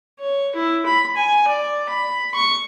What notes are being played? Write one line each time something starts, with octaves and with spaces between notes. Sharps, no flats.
C#5
E4
B5
G#5
D5
B5
C#6